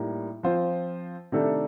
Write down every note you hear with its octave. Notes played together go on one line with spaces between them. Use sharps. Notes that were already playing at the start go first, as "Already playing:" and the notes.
Already playing: A2 G3 A#3 D#4
F3 C4 F4 C5
C3 D#3 A3 D4 A4